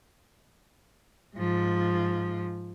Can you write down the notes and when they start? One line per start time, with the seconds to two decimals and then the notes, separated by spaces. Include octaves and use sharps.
1.35 G#2 F3